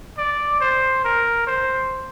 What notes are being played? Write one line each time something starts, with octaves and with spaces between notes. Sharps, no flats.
D5
C5
A#4
C5